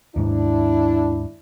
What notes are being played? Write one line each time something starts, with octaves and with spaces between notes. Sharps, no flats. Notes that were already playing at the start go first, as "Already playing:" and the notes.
D#2 G#2 D4 E4